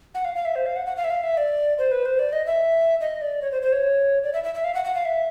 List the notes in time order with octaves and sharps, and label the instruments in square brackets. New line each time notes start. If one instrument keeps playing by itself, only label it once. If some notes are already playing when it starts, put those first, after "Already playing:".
[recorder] F#5
F5
F5
E5
C5
F5
F#5
F#5
F5
E5
F5
E5
D5
C5
B4
C5
D5
D#5
E5
D#5
D5
C#5
C5
C5
C#5
D5
E5
E5
E5
F5
F#5
F#5
F5
E5